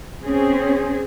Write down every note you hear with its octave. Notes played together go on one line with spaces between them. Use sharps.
C4 C#4 G#4